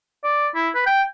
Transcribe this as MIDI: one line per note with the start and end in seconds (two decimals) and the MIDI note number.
0.24 0.48 74
0.55 0.70 64
0.75 0.86 71
0.87 1.03 79